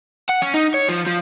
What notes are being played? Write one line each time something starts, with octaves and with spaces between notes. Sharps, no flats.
F#5
C#4
D#4
C#5
F3
F3